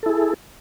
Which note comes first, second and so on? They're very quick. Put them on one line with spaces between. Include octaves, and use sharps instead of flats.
A4 E4 G#4